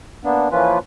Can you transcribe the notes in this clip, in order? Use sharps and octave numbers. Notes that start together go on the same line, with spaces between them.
A#3 B3 D4
E3 F3 A#3 C#4 F4 B4